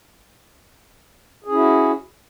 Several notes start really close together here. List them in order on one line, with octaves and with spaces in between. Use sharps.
G#4 C#4 E4 F#4